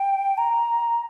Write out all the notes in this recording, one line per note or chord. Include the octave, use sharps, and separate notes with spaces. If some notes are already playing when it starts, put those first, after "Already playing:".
Already playing: G5
A#5